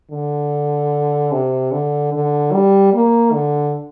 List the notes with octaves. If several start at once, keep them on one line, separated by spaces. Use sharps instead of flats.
D3
C3
D3
D3
G3
A#3
D3